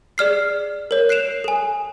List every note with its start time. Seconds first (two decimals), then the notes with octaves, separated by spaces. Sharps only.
0.18 G#4 D5 F6 C7
0.91 A#4 C#5
1.09 F#6 C7 D7 E7 F7
1.44 A4 G#5